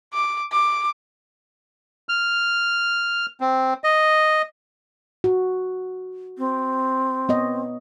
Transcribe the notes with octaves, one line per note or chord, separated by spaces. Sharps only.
D6
D6
F6
C4
D#5
F#4
C4
B3 C#5 D#5